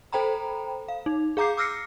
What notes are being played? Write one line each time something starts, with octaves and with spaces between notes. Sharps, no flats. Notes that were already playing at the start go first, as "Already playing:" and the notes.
A4 C5 G5 A#5 B5
F5
D#4
G#4 F5 A#5 D6 G6 C7
D6 E6 F6 A#6 C7 C#7